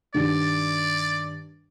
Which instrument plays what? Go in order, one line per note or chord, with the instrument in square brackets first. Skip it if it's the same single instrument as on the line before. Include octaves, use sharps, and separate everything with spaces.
[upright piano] G2 D#3 D4 [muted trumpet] D5